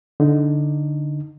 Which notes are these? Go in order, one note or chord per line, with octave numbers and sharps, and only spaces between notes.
D3 D#4